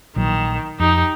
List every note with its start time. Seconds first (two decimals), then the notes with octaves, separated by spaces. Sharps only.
0.16 A#1 D#3 F#3
0.80 F2 D#4 G4